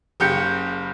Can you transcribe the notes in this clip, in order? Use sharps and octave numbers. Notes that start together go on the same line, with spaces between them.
F#1 C#3 G4 G6 C#7